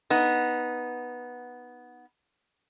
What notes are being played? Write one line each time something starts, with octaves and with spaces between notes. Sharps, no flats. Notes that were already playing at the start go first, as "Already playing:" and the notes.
B3 D#4